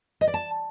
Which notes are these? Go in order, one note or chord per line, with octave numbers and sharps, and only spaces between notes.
D#5
D5
A5